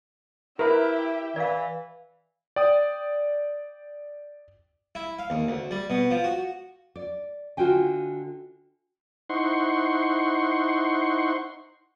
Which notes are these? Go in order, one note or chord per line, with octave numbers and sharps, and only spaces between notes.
E4 G4 A#4 B4 E5
E3 D5 F5
D5 G5 D#6
E4
F5
D#2
D2
G3
B2
F3
F#4
D5
D3 F4 F#4 D#5 G5 G#5
D#4 E4 C5 F#5 C6 C#6